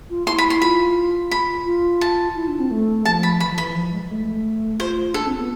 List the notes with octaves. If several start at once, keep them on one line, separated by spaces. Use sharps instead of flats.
F4
E4 C6
B5
C6
F4 B5
B5
F4
A5
E4
D4
C4
A3
F3 A5
B5
E3 B5
F3
E3 B5
F3
G#3
A3
F4 C5
D4 A4
C4
B3